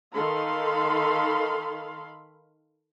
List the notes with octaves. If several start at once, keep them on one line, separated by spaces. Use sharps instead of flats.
D#3 A4 F5 B5 C6